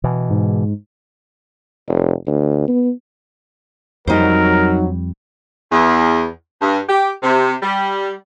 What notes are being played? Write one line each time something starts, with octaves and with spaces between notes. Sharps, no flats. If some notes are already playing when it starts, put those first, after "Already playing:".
B2 E3
G#2
F1
D2
B3
F2 F#3 G3 D#4 A#4 C5
E2
G2
G4
C3
G3